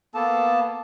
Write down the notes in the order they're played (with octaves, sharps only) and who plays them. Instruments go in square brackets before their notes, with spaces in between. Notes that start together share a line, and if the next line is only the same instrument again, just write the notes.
[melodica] A#3 B3 A5 [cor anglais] A4